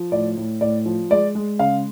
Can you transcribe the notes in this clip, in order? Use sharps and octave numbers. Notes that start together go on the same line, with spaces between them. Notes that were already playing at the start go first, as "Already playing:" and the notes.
Already playing: F3
A2 D5
A2
A2 D5
F3
G#3 D5
G#3
C#3 F5